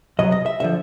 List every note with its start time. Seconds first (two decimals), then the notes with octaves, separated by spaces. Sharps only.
0.19 C2 C3 F#3 D#5
0.32 D#5
0.46 E5
0.60 D3 F3 E5